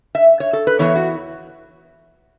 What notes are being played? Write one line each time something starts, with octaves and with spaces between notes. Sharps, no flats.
E5
C#5
A4
B4
E2 C#3 E3 B3 E4 C#5
F#4